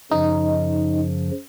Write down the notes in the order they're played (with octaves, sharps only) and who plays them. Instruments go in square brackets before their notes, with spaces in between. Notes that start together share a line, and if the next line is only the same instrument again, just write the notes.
[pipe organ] F#2 C#3 F3 [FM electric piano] D#4